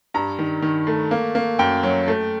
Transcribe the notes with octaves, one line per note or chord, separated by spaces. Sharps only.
G2 A#5
D#3
D#3
A3
A#3
A#3
F#2 G5
F#3
A3